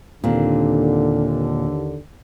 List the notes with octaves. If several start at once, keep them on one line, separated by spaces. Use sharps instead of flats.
D#2 A#2 D3 C4 D4